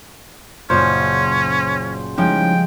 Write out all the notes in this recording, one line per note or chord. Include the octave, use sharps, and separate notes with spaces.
F#1 A#2 C#3 C#4 F4 C5
F3 G3 G#3 C#4 D#4 E4 G5